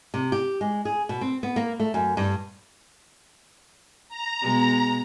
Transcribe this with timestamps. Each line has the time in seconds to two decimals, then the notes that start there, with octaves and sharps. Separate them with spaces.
0.14 C3
0.32 G4
0.61 G#3
0.85 G#4
1.09 B2
1.21 C4
1.43 B3
1.56 A#3
1.80 A3
1.94 F#2
2.17 G2
4.09 A#5
4.41 B2 G#3